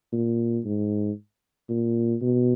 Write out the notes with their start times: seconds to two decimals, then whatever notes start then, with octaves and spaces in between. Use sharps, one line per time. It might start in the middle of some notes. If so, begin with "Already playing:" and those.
0.13 A#2
0.65 G#2
1.69 A#2
2.22 B2